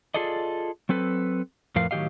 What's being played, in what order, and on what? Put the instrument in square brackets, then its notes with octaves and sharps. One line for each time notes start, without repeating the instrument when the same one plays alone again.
[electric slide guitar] F4 G#4 A4 D5 D#5
F#3 C4 A4 B4
F2 A2 F3 A#4 B4 F5
A2 D#3 F#3 G4 D#5 F5